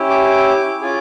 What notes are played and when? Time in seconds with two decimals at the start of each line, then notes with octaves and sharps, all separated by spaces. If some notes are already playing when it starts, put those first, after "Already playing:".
Already playing: C#4 E4 G4
0.10 D6
0.81 C#4 F4 G#4